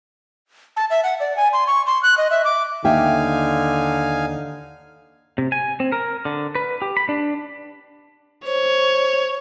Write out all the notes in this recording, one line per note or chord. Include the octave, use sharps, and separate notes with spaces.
A5
E5
F#5
D5
G#5
C6
C#6
C6
F#6
D#5
E5
D6
D#2 D3 D#4 E5 F5 G5 G#5
C3
G#5
C4
A#4
D3
B4
G4
B5
D4
C5 C#5